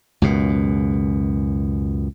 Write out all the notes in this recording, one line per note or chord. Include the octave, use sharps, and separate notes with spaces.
C#2 F#2 B2